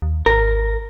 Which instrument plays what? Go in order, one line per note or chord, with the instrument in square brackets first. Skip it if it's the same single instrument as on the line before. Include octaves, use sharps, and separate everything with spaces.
[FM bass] D#2
[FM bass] G#1 [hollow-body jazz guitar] A#4